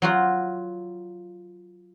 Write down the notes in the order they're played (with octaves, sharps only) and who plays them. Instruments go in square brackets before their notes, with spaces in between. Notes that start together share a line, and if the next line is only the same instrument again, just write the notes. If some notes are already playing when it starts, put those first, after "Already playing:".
[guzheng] F#3 F4 F#4